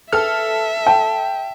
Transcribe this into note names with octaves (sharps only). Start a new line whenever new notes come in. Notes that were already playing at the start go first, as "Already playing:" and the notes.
A4 B4 E5 G5 F6
G5 A5